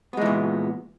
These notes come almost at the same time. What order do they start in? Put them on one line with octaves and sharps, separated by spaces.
B3 G#3 E3 A#2